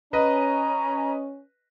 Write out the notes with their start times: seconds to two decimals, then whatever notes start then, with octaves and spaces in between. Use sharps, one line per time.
0.13 C#4 B4 D#5 A#5